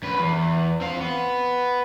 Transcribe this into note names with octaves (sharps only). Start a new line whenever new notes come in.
F#2 B4
E2
C4 F5
B3